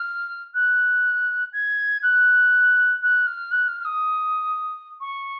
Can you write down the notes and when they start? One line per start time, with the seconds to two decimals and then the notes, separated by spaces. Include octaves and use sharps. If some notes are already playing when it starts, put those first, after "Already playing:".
Already playing: F6
0.54 F#6
1.53 G#6
2.02 F#6
3.02 F#6
3.26 F6
3.51 F#6
3.68 F6
3.80 F6
3.85 D#6
5.00 C#6